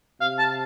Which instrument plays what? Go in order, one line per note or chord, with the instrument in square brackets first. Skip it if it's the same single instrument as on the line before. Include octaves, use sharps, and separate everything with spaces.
[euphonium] C3 [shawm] F5
[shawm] A5